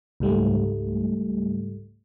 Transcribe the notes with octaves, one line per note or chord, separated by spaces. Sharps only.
C#2 G#2 G3 A3